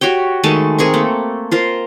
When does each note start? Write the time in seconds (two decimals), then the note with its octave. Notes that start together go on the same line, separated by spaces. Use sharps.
0.01 F#4 G4 C#5 G5
0.43 D#3 G#3 A3 A5
0.78 C4 G#4 A#4 C#6
0.94 A3 A#3
1.51 F4 A#4 C5